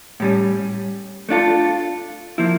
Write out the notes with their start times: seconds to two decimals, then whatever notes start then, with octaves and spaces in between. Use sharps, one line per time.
0.20 A2 G3 C#4
1.29 A3 D4 F4 A4
2.38 F3 A#3 E4